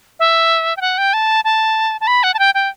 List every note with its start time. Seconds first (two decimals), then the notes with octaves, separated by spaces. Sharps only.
0.19 E5
0.77 G5
0.81 F#5
0.98 G5
1.13 A5
1.44 A5
2.01 A5
2.07 B5
2.23 F#5
2.34 A5
2.39 G5
2.54 G5